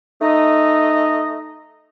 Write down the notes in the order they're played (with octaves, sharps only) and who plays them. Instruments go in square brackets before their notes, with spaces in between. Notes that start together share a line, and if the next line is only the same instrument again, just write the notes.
[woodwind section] A3 D#4 D#5